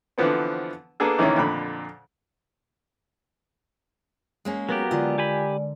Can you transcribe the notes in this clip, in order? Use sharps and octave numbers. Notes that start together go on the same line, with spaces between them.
D3 E3 F3 B3 C4
A#3 B3 D4 G#4 A4
C3 D#3 E3 A#3 C#4
F2 A#2 D3 B5
G#3 A#3 C#4
F#3 B3 F#4 G4 A#4 F5
D3 G#3 F4 D5 D#5
G4 G#5 B5